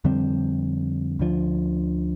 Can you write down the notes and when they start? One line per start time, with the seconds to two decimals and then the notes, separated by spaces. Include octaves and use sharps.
0.04 F2 D3 G3 C4
1.19 D2 D3 F3